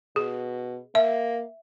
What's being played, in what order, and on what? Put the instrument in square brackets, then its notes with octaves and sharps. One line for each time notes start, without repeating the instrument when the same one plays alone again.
[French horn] B2 [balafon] G#4
[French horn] A#3 [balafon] E5